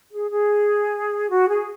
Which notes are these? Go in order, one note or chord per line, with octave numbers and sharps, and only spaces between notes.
G#4
G#4
F#4
G#4